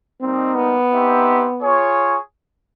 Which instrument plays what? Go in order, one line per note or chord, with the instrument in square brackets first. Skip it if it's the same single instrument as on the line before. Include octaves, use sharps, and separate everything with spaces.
[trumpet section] G3 A#3 D#4 [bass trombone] C4
[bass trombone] B3
[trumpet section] C4 D#4 G4 C5 E5
F4 G#4 C#5